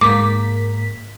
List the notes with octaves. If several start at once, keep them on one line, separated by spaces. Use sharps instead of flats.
G#2 A#3 D6 B6